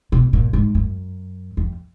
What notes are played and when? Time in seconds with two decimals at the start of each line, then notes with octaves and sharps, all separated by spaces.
0.12 B2
0.33 A#2
0.53 G#2
0.75 F#2
1.57 F2